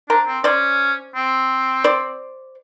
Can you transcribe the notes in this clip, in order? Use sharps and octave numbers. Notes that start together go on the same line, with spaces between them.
D4 A#4 C5
C4
C#4 C5 D5
C4
C5 D5